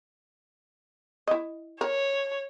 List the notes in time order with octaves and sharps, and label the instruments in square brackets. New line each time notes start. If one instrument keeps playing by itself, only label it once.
[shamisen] E4 D#5
[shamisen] A#4 [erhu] C#5